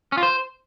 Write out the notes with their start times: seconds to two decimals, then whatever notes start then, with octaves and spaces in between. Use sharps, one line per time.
0.12 C#4
0.17 F4
0.23 C5